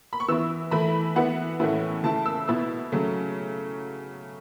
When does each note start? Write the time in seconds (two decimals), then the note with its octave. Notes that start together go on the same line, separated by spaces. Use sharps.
0.13 B5
0.20 C#6
0.28 E3 B3 E4 E6
0.71 E3 A3 E4 B5
1.16 E3 B3 E4 F#5
1.60 A2 E3 A3 C#4 E4
2.03 C#3 A3 E4 A5
2.26 E6
2.48 B2 B3 E4 E6
2.92 C#3 F#3 A3